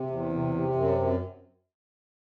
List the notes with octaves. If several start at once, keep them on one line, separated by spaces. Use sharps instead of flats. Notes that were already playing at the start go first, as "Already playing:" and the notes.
Already playing: C3
E2
C3
C3
F#2
F#2